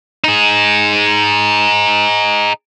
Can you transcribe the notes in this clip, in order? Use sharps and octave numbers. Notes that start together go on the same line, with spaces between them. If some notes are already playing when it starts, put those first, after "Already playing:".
D#4 G#4